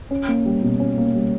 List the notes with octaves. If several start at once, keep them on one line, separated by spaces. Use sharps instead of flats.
C#4
A#3
G3
B2
C#4
A#3
G3